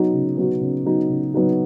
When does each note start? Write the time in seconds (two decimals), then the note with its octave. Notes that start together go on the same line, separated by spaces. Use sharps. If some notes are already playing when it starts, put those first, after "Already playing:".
Already playing: F#3 B3 D#4 F#4
0.13 C#3
0.37 F#3 B3 D#4 F#4
0.61 C#3
0.86 F#3 B3 D#4 F#4
1.10 C#3
1.34 F#3 B3 D#4 F#4